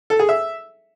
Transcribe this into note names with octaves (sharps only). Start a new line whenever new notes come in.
A4
G#4
E5